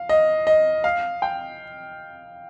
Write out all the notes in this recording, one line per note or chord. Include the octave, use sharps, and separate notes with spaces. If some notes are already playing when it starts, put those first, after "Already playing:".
Already playing: F5
D#5
D#5
F5
G5